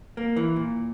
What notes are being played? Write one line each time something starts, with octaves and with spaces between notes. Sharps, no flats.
A#3
E3
A#2